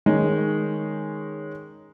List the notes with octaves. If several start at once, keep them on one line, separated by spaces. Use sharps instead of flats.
D#3 G#3 C#4 D#4